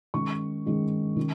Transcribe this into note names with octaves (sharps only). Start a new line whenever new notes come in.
D#3 G#3 C#4 C#6
D#3 G#3 C#4
D#3 C#4